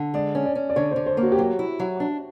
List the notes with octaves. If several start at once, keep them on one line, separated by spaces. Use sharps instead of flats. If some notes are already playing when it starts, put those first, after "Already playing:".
Already playing: D3
G#3 D5
C#4
D5
C#4
D5
D3 C#5
C5
D3
C5
A#3
F#4
G4
F#3 F#4
E4
F#3
D4